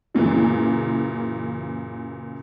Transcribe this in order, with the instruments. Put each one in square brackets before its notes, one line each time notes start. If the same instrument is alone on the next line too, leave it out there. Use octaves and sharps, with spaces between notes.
[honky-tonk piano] F#2 A#2 C#3 E3